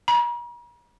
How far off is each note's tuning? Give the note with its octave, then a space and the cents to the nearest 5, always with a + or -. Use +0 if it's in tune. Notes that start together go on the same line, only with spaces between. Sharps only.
A#5 +45